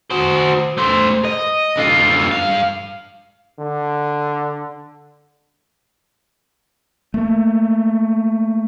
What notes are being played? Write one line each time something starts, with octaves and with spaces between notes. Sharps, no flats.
F#4 C5
A3 C5
D#5
D3 F4
G2 F5
D3
A3 A#3